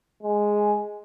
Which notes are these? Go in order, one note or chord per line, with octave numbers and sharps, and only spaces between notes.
G#3